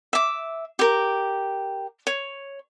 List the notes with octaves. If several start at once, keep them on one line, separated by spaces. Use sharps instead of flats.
E5 D6
G4 A#4
C#5